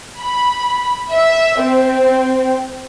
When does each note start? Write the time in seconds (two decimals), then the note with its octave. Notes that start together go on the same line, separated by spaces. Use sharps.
0.19 B5
1.13 E5
1.63 C4